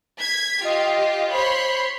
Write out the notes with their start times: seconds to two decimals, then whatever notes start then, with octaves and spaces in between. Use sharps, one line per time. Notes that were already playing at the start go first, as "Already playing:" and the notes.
0.18 G#6 B6
0.65 F4 G4 D#5
1.33 C5 C#5 B5 C6